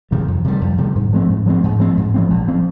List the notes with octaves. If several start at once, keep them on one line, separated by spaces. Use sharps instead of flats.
C3 D#3 G3
F2
C3 D#3 G3
F2
C3 D#3 G3
G#2
F3 G#3 C4
G#2
F3 G#3 C4
G#2
F3 G#3 C4
G#2
F3 G#3 C4
A#1
F3 C4